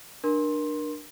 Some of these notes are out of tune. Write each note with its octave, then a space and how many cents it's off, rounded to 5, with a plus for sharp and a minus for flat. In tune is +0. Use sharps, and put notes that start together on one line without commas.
D4 +25 A#4 +25 C6 +15